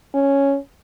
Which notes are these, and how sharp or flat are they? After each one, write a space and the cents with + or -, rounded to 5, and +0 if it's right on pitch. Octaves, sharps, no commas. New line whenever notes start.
C#4 +0